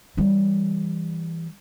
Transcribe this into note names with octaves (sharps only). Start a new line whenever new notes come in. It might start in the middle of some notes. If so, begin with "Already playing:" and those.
E3 G3